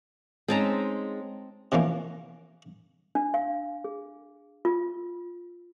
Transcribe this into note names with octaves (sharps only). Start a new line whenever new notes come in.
G#3 C4 C#4 D#4 A5 A#5
B2 E3 F3 A#3 C#4
D4
F5
G#4
F4